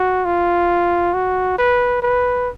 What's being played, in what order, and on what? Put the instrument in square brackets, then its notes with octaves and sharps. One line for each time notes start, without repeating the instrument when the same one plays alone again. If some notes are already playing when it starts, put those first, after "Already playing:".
Already playing: [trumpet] F#4
F4
F#4
B4
B4